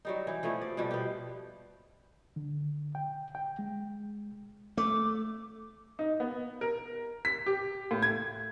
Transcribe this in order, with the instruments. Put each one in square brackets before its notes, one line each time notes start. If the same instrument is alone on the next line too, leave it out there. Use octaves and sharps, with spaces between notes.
[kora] F#3 G3 D#4
E3 G4
F3 A3 B3 E4
D5
B2 F3 G3
B3 G4
[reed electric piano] D3
G5
G5
G#3
[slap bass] A3 [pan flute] D6
[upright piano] D#4
B3
A#4
B6
G4
A2
G#6